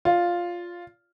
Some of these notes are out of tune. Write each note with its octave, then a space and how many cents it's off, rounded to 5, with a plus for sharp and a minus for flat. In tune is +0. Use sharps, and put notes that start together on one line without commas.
F4 +0 D5 -30